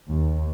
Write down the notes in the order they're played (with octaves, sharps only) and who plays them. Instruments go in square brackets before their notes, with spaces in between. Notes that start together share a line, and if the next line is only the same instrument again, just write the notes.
[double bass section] D#2